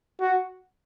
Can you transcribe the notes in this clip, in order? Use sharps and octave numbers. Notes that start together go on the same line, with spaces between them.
F#4